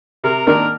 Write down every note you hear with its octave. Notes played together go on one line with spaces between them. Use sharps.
C3 A#4
D#3 A#3 D4 A#4